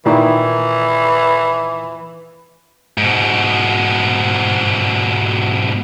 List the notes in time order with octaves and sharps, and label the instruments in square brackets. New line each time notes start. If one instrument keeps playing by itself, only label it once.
[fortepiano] A#2 D#3 E4 [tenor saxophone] E3
[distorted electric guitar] G#2 B2